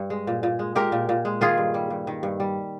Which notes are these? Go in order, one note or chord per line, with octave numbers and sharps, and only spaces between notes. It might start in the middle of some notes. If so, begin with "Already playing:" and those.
Already playing: G2
G#3
A#2
A#2
G#3
G#3 G4 A#4
A#2
A#2
G#3
D#3 F4 G#4
G2
G3
G2
D#3
G2
G3